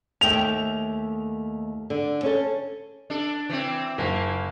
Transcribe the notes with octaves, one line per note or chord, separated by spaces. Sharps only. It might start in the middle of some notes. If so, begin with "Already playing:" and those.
D#2 A3 G5 F7
D3
C#4 A4
D4 A4
E3 C4
F#1 A#3